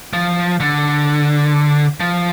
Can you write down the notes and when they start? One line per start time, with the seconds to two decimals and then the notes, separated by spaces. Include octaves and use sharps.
0.13 F3
0.60 D3
2.00 F3